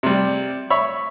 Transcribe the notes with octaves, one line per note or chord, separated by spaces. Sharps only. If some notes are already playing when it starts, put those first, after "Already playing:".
C3 G3
C#5 E5 B5